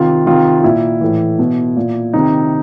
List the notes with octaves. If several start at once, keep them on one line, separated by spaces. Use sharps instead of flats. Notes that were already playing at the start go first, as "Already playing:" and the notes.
Already playing: C3 D#3 F4
C3 D#3 F4
F4
A#2 E4
A2 E3
B2
A#2
C3 D#3 D#4